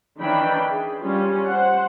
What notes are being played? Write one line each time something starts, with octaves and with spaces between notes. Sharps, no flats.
D#3 E3 C#4 D4 G5 B5
G#4
G3 C#4 F4
C5 F#5